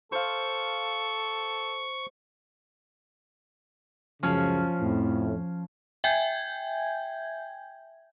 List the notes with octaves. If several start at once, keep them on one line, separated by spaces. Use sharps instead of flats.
A4 C5 F5 C#6
C#2 F#2 C#3 F3 C#4
F2 A2
E5 G5 G#5 G6 G#6